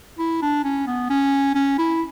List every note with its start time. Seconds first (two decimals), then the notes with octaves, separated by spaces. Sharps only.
0.18 E4
0.42 D4
0.64 C#4
0.87 B3
1.10 C#4
1.55 C#4
1.78 E4